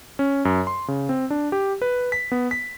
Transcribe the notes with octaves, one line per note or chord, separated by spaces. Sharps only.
C#4
F#2
C6
C#3
C4
D4
G4
B4
B6
B3
B6